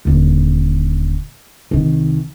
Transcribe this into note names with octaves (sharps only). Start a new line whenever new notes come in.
D#1 D3
C2 D#3